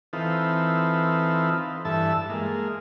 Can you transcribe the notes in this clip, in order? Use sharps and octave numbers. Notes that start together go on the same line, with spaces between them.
E3 C4 D#4 F4 A4 B4
G2 E3 A4 E5 A5
G#3 A#3